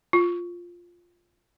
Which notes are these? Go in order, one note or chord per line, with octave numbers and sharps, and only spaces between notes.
F4